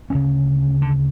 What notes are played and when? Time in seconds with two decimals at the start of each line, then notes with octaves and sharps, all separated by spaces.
0.10 D2 C#3 C#4
0.82 D3